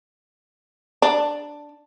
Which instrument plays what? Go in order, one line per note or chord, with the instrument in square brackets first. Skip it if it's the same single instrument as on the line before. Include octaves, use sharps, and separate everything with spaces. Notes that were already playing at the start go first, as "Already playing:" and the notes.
[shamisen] D4